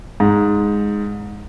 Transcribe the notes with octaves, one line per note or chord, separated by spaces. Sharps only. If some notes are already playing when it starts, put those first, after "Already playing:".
G#2